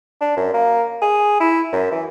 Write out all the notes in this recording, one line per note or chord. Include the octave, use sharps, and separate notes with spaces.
D4
F#2
A#3
G#4
E4
F#2
E3